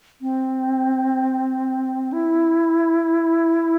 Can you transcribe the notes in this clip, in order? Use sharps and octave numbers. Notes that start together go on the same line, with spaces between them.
C4
E4